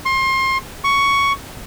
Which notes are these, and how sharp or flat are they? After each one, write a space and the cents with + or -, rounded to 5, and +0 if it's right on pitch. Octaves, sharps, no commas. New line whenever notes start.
C6 +30
C#6 +10